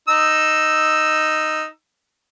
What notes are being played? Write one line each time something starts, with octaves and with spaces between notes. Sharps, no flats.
D#4 E6